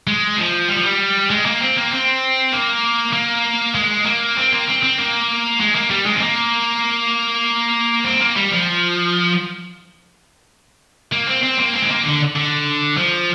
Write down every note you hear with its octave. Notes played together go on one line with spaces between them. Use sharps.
G#3
F3
G3
F3
G3
G#3
A#3
C4
A#3
C4
A#3
A#3
G#3
A#3
C4
A#3
C4
C4
A#3
G#3
A#3
G3
G#3
C4
A#3
C4
A#3
G3
F3
A#3
C4
C4
A#3
C4
G#3
A#3
D3
D3
F3